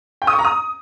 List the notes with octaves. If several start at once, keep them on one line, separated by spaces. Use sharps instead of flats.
G5
D#6
C#6
A#5
D#6